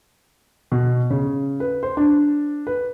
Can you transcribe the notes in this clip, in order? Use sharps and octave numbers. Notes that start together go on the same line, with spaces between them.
B2
C#3
B4
C5
D4
B4